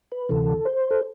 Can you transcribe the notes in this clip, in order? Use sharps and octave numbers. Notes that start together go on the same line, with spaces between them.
B4
D2 C3 E3 A4
C5
A4